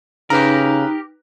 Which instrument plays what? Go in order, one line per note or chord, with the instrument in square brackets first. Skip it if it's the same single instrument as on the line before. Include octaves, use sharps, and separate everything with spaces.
[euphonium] C#3 [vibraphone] D#4 [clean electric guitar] G4 A#4 [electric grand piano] B4 A#5